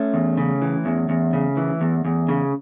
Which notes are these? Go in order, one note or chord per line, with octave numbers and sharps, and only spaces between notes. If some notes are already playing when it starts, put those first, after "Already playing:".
Already playing: A3 C#4
E2
C#3
E3
E2
E2
C#3
E3
E2
E2
C#3